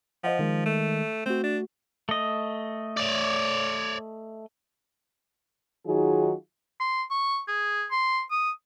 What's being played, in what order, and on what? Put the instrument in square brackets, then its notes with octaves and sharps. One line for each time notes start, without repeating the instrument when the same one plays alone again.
[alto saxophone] F3 [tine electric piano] C5 D#5 F#5
[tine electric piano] D#3 G#3
[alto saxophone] A3
[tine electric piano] A3 F#4 [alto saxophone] C4
[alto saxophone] D4
[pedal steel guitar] A3 D#5
[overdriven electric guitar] C#5 D5
[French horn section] D#3 F#3 D#4 F4 F#4 G#4
[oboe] C6
C#6
G#4
C6
D#6